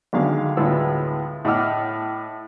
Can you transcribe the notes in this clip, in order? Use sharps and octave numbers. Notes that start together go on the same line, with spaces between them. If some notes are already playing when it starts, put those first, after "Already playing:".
B1 D3 D#3 G#3 F5
D2 A2 G#3 B3 F4 E6
A2 D#5 F#5 D6 E6 F6